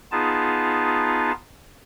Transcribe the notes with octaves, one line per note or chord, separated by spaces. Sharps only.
B3 D#4 F4 G#4 A5